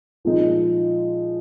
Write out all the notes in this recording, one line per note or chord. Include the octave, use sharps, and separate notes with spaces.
A#2 F3 G#3 D#4